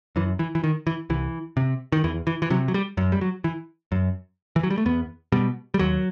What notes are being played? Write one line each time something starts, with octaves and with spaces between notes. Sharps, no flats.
F#2 E3
E3
E3
D#3
E3
C2 E3
C3
D#3
E2 E3
E3
E3
C3 F#3
F#3
G3
F#2
G3
F#3
E3
F#2
E3
F#3
G3
A3
E2 B3
B2 G3
G3
D#2 F#3